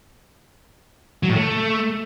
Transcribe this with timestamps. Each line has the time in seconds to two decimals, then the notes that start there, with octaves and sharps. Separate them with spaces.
1.23 F#3
1.29 A2
1.36 A3